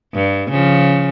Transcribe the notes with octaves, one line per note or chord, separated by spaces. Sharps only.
G2
C#3 F3